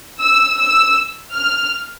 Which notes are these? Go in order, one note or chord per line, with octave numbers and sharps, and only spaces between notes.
E6
E6
F6